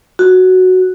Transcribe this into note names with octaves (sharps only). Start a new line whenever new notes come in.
F#4